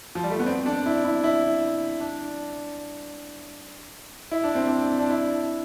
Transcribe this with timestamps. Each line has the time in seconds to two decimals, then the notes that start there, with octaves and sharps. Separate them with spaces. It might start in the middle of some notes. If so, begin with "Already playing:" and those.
0.15 F3
0.23 G3
0.31 A3
0.40 B3
0.46 C4
0.66 D4
0.86 E4
1.05 E4
1.24 E4
2.00 D4
4.31 E4
4.43 D4
4.55 C4
4.67 D4
4.98 D4
5.10 E4